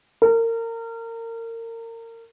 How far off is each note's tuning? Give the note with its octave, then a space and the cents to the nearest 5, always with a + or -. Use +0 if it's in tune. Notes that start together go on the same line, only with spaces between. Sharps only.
A#4 -30